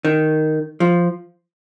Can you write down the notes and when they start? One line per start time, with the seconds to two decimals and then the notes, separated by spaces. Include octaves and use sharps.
0.05 D#3
0.80 F3